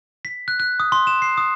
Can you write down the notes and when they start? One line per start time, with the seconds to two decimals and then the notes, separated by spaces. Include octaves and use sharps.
0.25 B6
0.48 F#6
0.60 F#6
0.80 D#6
0.92 C6
1.07 E7
1.22 C7
1.37 D#6